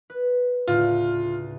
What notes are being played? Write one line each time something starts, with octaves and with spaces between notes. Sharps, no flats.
B4
D2 A2 C#3 F4